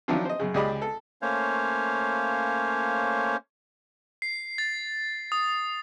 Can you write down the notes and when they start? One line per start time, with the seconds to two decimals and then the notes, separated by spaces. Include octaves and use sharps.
0.08 D#3 F3 F#3 D4 E4 F4
0.25 C5 D#5
0.40 F#2 C#3
0.54 C#2 G4 G#4 D5 D#5 B5
0.82 A4
1.22 A3 A#3 C#4 C5 C#5 F5
4.22 C7
4.58 A6
5.32 D#6